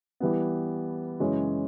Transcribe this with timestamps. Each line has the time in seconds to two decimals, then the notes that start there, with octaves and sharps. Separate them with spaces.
0.20 E3 G3 B3
1.20 F#2 C#3 E3 G#3 C#4